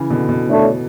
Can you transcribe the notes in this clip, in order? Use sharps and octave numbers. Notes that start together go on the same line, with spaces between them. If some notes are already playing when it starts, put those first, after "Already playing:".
Already playing: C#3 E3
B2 D3
B2
A3 D4 A4 C#5